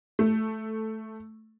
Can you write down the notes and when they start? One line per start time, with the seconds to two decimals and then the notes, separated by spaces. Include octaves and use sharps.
0.19 A3